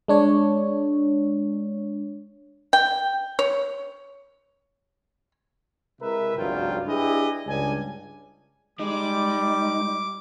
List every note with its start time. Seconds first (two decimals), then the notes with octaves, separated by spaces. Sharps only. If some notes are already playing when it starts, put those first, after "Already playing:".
0.08 G#3 D4 C#5
2.73 G5
3.39 C#5
6.00 C3 G#3 E4 A#4 B4 E5
6.37 G#1 C#2 G2 F#3 F4 G5
6.87 D4 E4 G4 G#4 B4 D#5
7.47 C#2 G2 G3 D4 G#5
8.79 G3 G#3 D#4 D6